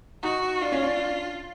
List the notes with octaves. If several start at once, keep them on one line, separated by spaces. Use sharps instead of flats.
D#4 F#4
D4 F4
C#4
D4